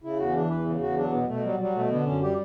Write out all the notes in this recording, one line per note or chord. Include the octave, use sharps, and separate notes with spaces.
C#3 E4
E2 F#4
C#4
E3 D4
E2 B4
C#3
E2 F#4
F#3 D4
B2 B3
B2 A3
F#3 G3
F#3 G3
B2 A3
D3 B3
F#2 C#4
G3 G4